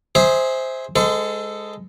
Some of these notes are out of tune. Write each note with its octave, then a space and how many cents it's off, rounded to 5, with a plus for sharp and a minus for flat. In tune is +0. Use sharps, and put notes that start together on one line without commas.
G#4 -5 C5 +0 E5 -25
G#3 +0 A4 +10 C5 -35